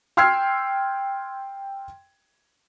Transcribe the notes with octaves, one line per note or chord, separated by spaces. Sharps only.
G5 C6 E6 F6 G#6 C7